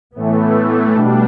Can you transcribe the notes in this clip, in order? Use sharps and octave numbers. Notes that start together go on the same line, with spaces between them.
A2 E3 A3 B3
B2 G3 A3 D4